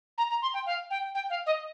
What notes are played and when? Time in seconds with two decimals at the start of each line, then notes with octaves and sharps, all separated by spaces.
0.18 A#5
0.30 A#5
0.42 C6
0.54 G5
0.66 F5
0.90 G5
1.15 G5
1.30 F5
1.46 D#5